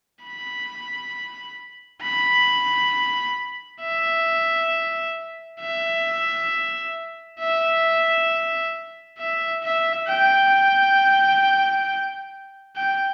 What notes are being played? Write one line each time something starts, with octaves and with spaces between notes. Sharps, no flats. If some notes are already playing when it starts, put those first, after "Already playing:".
B5
B5
E5
E5
E5
E5
E5
G5
G5